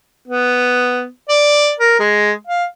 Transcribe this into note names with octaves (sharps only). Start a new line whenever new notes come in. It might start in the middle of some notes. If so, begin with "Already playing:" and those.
B3
D5
A#4
G#3
F5